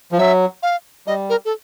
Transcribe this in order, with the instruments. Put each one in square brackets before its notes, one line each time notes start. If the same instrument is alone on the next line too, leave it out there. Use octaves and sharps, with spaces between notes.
[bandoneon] F3
[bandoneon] F#3 [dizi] E5
[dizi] F5
[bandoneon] G3 [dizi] D#5
[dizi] A#4
A4